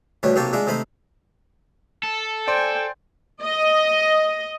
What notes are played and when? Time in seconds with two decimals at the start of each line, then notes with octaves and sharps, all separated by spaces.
0.23 D2 B2 G3 A3 C#5
0.36 B1 C3 A#3 G4 A5 C#6
0.53 G#3 D4 F4 E5
0.67 C3 A3 D#4 C5 B5
2.03 A4
2.47 C5 D5 G5 G#5 C6
3.42 D#5